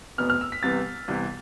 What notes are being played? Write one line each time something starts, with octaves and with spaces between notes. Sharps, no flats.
F1 E2 B2 B3 F6
F6
E6
B6
C2 C3 E3 B3 A6
C2 C3 E3 B3